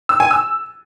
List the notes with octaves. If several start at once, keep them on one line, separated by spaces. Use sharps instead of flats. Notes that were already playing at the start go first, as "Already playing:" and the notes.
E6
G#5
E6